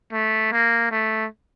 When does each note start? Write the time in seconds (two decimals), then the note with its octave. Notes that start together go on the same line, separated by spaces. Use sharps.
0.12 A3
0.52 A#3
0.91 A3